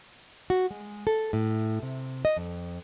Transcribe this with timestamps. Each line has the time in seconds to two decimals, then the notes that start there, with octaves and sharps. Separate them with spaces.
0.50 F#4
0.71 G#3
1.07 A4
1.33 A2
1.83 C3
2.25 D#5
2.37 F2